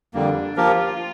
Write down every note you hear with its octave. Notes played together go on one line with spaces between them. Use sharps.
F2 D3 G3 A#3 D4
F3 A#3 F4 G4 A#4